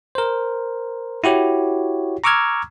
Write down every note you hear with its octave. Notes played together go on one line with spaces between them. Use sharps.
A#4 C5
E4 F#4 G4 C#5
A#5 C#6 D6 E6 F6 G#6